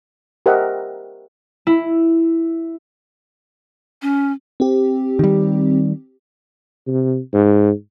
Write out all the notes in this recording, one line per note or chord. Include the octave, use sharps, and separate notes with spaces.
G4 A#4 C5 D#5 E5 F#5
E4
C#4
C4 G4
D#3 G3
C3
G#2